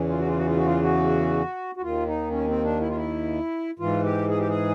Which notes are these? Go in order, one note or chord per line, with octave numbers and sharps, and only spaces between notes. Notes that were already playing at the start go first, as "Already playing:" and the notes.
Already playing: E2 C#3 E3
F4
F#4
F4
F#4
F4
F#4
F4
F#4
F#4
D#2 D#3 F4
D#4
C#4
C4
D4
E4
F4
E4
G#2 E3 F4
G4
G#4
G4
G#4